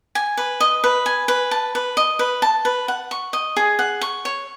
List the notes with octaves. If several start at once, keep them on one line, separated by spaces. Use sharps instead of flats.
G#5
B4
D#5
B4
G#5
B4
A5
B4
D#5
B4
A5
B4
F#5
C#6
D#5
G#4
F#5
C#6
C#5